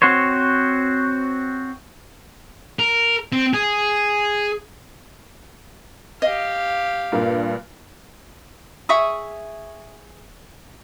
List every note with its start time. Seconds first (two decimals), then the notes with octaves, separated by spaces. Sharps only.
0.02 C4 F#4 C5 C#5
2.79 A#4
3.32 C4
3.54 G#4
6.22 G4 D#5 F5
7.12 G2 A#2
8.89 G#4 E5 C#6 D#6